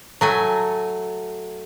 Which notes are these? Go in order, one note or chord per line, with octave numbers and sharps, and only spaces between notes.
F#3 A3 G#5